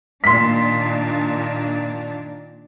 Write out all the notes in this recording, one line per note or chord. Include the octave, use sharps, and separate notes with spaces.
A#2 D#3 D4 C6 B6